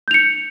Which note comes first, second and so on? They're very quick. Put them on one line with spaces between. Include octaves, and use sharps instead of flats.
G6 F7 C#7